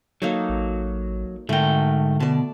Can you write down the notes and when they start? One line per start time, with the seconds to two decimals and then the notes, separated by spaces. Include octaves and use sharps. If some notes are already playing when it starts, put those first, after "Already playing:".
0.22 F#3 A#3 D#4 A4
0.49 A1
1.49 G#2 D3 A3 A#4 G5
2.20 B2 D5 A5